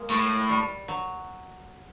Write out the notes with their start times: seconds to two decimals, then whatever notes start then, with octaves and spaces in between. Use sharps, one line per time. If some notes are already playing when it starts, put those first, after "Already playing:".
Already playing: G#3 A#3
0.10 A2
0.49 G3
0.88 F#3